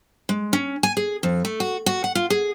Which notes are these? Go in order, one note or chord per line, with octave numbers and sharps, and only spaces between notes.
G#3
C#4
G#5
G#4
F2
A3
F#4
F#4
F#5
F4
G#4